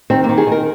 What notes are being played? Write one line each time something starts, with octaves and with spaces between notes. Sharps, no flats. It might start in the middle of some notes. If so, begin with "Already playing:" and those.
D#3 C4
A#3
D#3
G#4
D#3
A#4